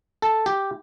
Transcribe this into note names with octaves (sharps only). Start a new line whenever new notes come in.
A4
G4